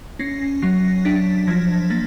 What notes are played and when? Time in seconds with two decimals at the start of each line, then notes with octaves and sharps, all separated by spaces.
0.19 C#4 A#6 C7
0.62 F#3 A#6 C7
1.05 D4 A6 B6
1.47 F3 G#6 A#6
1.90 A#3 A6 B6